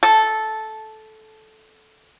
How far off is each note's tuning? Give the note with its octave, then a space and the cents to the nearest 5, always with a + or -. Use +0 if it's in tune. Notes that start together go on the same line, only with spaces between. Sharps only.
A4 -10